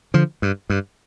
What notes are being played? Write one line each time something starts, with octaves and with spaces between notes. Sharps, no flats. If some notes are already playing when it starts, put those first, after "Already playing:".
D3 F3
G2
G2